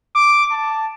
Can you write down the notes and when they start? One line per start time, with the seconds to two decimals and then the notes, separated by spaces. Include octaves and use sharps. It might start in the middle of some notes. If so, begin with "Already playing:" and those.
0.15 D6
0.51 A5